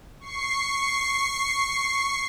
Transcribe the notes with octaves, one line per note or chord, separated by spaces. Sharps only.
C#6 C7